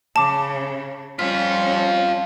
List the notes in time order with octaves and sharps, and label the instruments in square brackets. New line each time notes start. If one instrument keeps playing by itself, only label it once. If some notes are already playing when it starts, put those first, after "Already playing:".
[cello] C#3 [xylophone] A5 D6
[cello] G3 C#4 [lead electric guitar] C4 F4 [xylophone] B6